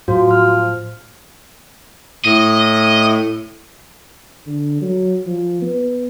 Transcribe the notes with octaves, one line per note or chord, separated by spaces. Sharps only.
A2 F3 F#3 F#4
F6
A2 D#5
D3
F#3
F3
B3